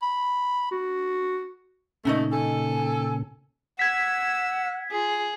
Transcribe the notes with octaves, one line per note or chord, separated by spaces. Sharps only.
B5
F#4
A#2 C#3 A3 C#4 D#4 D#5
A4 G#5
F#5 E6 G#6 B6
F4 G#4